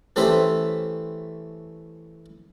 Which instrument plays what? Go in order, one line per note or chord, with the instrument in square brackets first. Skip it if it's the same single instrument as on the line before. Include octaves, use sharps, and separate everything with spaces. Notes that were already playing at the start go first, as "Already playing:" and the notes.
[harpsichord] E3 A3 C#4 G4 C5 E5